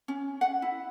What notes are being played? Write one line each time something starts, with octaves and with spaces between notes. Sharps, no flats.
C#4
F#5
E4